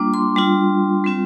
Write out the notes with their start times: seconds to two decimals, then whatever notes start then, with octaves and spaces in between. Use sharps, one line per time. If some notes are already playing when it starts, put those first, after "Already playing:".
Already playing: G3 A#3 D4 F4 D6
0.14 C6
0.36 G3 D4 F4
1.04 G3 C4 F4